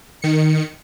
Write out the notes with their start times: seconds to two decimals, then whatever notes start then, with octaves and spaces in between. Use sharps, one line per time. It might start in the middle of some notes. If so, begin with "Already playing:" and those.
0.22 D#3 C#7